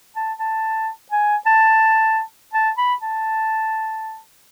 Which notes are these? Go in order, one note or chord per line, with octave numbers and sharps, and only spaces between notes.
A5
A5
G#5
A5
A5
B5
A5